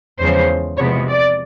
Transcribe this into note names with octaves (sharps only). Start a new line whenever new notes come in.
E2 C#3 F3 G#3 C5
E2 C3 F3 G#3 B3 C#5
D5